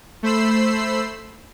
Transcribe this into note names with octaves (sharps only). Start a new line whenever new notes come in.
A3 C5 B5 E6 C7